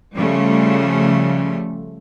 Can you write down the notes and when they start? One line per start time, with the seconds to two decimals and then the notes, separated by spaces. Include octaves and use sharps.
0.13 C#3 F3 G3 A3